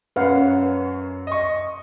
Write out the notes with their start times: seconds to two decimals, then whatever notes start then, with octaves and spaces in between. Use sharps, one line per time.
0.16 F#2 C#4 B4 F5 F#5
1.27 D#5 C#6